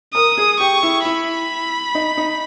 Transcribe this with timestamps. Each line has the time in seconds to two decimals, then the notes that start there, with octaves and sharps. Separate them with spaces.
0.14 A#4 D#6
0.38 G#4
0.60 G4 C#6
0.83 E4
1.05 E4 B5
1.95 D#4
2.17 D#4